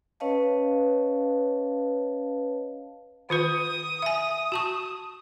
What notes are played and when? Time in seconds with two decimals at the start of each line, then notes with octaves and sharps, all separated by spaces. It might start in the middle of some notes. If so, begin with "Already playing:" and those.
0.20 C#4 B4 C#5 D#5 F5 A5
3.30 D#3 F4 B4 D#6
4.02 E5 G#5
4.52 F#4 A5 C#6